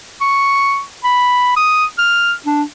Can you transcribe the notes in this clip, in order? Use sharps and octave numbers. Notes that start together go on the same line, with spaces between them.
C#6
B5
D#6
F6
D4